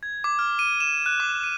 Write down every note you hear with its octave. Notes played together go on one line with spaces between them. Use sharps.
G#6
D6
F6
D#7
E7
F#6
D6
D#7